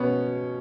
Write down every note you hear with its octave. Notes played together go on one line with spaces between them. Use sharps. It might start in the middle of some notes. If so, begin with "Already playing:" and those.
Already playing: B2 B3 C#4